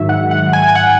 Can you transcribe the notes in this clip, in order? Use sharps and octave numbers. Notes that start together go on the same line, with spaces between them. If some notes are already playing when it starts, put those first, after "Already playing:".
Already playing: G#2 D#3 F#3 E5
F#5
F#5
G#5
G#5
F#5